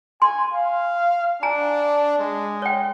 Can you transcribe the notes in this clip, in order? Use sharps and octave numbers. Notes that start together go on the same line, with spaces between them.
G#5 C6
F5
D4 G#5 A#5
G#3
C#5 G5